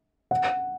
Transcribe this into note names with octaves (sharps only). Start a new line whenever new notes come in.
F#5